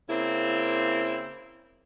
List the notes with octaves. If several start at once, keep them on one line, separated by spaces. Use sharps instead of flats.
C#3 A#3 C4 E4